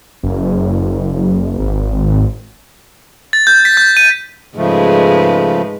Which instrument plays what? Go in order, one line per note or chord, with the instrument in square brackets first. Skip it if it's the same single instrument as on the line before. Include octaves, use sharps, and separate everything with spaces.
[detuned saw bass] F#1
G#1
[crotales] A6
G6
B6
G6
D#7
[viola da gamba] G#2 G#3 B4 [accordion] C#3 F3 A3